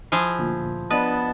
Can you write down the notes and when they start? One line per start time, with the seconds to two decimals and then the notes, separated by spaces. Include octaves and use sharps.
0.12 F3 E4 G#4
0.38 D2 A#2
0.91 B3 D4 B4 D#5 A5